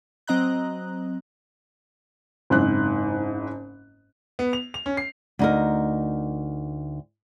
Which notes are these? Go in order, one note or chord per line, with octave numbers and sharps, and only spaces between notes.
F#3 C4 D#5 A#5 F#6
F#1 G#2 C4 F#6
B3
F7
F7
C#4
C7
D2 D#4 A#4